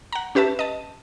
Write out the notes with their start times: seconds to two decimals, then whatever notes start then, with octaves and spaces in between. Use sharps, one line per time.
0.12 F#5 A#5
0.35 C#4 G4 B4 E5 A5
0.59 D#5 A5